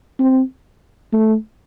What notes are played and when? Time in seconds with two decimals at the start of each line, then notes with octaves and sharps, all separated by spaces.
0.19 C4
1.13 A3